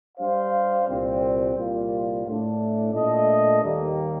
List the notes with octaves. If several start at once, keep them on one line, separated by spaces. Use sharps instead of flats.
G3 D4 G4 C5 F5
C2 A#2 G3 C4
C2 A#2 G3 A#3 F4
A2 A3 D4
A#2 A3 D4 A4 D#5
D#2 D#3 G3 A#3